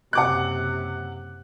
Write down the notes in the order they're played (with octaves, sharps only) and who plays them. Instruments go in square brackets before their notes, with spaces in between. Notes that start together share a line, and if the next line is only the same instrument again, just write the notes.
[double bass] F#1 C3 [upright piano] F#5 D6 F#6